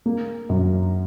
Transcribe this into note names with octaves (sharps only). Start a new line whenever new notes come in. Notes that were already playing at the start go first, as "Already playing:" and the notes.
A#3
F#2